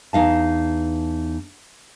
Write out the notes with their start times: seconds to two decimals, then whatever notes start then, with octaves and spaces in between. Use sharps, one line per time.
0.13 E2 D#4 F5 A5